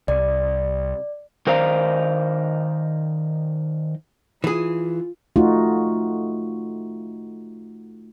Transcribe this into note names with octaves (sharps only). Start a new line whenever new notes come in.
C2 D5
D#3 A#4 C5 D5 F5 A#5
E3 F4 G#4
A3 D#4 F4 F#4